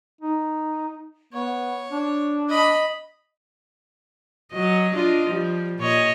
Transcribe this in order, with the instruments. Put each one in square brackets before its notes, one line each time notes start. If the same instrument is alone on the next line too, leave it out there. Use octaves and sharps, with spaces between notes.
[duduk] D#4
[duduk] B3 [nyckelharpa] C#5
[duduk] D4
[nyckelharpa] D#5 B5
[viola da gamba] F#3 D#5
D4 F4 D#5
F3 G3
A#2 C#5 D#5